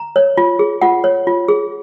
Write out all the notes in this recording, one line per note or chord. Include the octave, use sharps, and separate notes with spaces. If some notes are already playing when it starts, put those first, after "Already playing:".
Already playing: A#5
C#5
F4
G#4
F4 F#5
C#5
F4
G#4